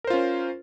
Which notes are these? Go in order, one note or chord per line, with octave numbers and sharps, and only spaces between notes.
C#4 F4 A#4 C5